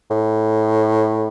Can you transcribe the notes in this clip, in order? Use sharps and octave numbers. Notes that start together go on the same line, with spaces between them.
A2